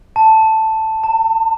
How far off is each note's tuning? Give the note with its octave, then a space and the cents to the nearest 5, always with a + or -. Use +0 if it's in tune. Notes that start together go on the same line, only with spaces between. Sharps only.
A5 +5
A5 +40